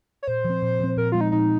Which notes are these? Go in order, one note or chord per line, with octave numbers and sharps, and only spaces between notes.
C#5
A#2 C5
F3
C4
A#2
F3 C4
A#2 A#4
F3 G#3 F4
D#4
A#2 D#4